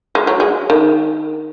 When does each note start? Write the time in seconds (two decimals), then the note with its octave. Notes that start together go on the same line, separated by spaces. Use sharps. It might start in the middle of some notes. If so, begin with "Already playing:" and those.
0.15 G#3
0.27 F#3
0.40 G#3
0.70 D#3